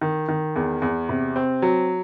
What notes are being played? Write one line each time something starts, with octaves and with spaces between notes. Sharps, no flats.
D#3
D#3
E2
E2
C3
C4
F#3